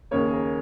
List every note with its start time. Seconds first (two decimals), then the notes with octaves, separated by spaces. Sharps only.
0.11 D#2 C#3 A#3 C#5
0.26 G#4
0.33 A#4